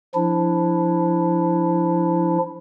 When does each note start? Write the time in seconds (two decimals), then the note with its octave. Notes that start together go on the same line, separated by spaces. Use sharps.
0.15 F3 D4 E4